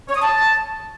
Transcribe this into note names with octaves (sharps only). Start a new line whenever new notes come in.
C#5
D#6
A5